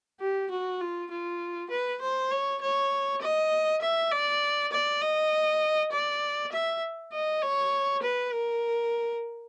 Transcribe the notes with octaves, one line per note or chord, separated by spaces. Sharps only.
G4
F#4
F4
F4
B4
C5
C#5
C#5
D#5
E5
D5
D5
D#5
D5
E5
D#5
C#5
B4
A#4